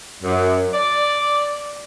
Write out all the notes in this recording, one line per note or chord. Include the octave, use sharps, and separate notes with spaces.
F#2
D5